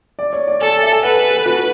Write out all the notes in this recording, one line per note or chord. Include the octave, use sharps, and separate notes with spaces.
D5
C#5
D5
A4 G#5
G#5
E5
G#5
B4 F#5
A4
A4
F#4